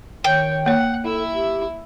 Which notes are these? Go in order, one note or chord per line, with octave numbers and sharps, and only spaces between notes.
D#3 C#5 G5
A#3 C#5 F#5
E4 A4 E5
G4